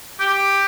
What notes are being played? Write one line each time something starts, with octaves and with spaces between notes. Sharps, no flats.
G4